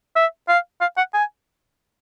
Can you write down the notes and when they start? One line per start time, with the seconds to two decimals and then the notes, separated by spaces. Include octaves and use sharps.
0.16 E5
0.49 F5
0.81 F5
0.98 F#5
1.14 G#5